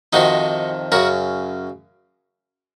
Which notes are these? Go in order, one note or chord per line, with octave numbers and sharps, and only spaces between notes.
F2 C3 D#3 D#4 F#4
F#2 C#3 F#4 A#4